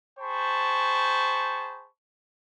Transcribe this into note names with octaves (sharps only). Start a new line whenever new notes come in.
G#4 C5 G5 A5 B5 C#6